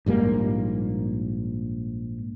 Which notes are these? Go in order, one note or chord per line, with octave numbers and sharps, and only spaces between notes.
A#1 G#2 G3 A#3